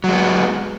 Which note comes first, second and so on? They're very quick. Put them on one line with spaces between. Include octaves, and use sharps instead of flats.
F#3 G#3 B3